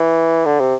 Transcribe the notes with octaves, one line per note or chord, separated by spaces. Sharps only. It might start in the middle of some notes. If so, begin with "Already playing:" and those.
Already playing: E3
D3
C3